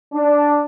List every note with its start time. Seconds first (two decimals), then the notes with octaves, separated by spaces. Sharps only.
0.13 D4